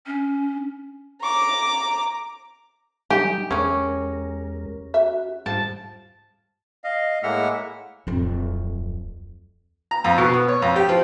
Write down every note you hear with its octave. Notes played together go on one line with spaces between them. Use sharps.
C#4
A#5 D6
F#3 G3 D#4 G4 G#5
E2 G#3 C#4 G#4 A#4 C#5
F#4 E5
G#2 F3 G3 A5
D#5 F5
A2 G#3 A#3 E5 F#5 F6
D1 F2
A#5
F2
B2
B3
C#5
F2
G4
F3